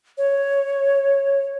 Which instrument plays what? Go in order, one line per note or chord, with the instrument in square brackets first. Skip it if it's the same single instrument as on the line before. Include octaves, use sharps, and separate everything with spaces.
[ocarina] C#5